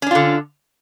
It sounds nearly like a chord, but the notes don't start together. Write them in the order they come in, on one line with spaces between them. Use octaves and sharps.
C#4 D4 F4 D3